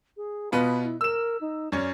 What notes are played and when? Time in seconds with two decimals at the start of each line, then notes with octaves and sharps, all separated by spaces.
0.17 G#4
0.52 B2 B3 F4 B5
0.84 E4
1.01 A#4 E6 E7
1.41 D#4
1.72 F#2 C#4 D5